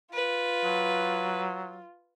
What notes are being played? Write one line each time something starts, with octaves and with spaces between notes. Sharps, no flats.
F4 B4
F#3